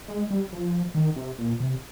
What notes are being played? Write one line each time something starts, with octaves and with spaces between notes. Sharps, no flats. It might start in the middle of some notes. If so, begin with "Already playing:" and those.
G#3
G3
F3
D#3
C3
A#2
C3